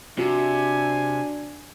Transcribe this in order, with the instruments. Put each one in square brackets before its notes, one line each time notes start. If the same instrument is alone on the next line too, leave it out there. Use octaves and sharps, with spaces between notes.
[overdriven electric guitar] C3 [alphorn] D4 [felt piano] F#4 [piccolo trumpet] G#5